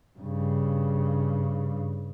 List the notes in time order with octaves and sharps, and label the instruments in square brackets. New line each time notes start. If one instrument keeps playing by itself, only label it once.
[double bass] G2 C#3